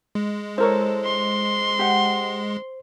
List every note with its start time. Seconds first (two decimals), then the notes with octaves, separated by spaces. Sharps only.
0.15 G#3
0.58 E4 A4 A#4 C5 C#5
1.05 C6
1.79 G4 F#5